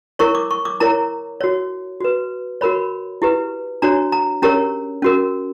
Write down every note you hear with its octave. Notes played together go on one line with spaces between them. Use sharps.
E4 A#4 C#5 C#6
D6
C#6
D6
E4 A#4 C#5 A#5
F#4 C#5
F#4 B4
F#4 A#4 C#5 B5
E4 G4 B4
D4 F#4 C#5 A#5
A#5
C#4 G4 A#4 C#5 A#5
C#4 F#4 A#4